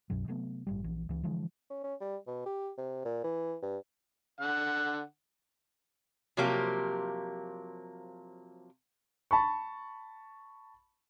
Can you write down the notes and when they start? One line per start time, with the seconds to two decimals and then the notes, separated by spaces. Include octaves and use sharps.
0.10 B1 F#2 B2 F#3
0.28 C3 F#3 A3 B3
0.67 A1 G2 G3
0.84 A#1 E3
1.09 C#2 E3
1.23 D3 E3 F3 G#3
1.70 C#4
1.84 C#4
2.01 G3
2.27 B2
2.46 G4
2.78 C3
3.05 A#2
3.24 E3
3.62 G2
4.41 D3 F#5
6.37 C3 F3 F#3 A#3 G4
9.31 A5 B5 C#6